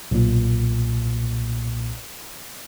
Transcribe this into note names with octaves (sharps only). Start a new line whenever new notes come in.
B1 A#2